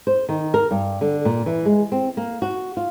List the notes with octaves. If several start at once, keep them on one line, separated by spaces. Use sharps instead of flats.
C5
D#3
A#4
G2
D3
A#2
E3
G#3
C4
A#3
F#4
F4